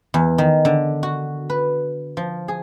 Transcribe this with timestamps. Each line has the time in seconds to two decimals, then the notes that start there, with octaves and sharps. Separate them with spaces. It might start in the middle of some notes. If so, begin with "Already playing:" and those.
0.14 E2
0.38 D#3
0.65 D3
1.03 F#4
1.50 B4
2.17 F3
2.48 G#4